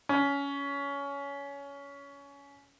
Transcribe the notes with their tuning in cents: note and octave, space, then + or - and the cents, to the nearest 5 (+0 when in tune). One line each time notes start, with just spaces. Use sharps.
C#4 +20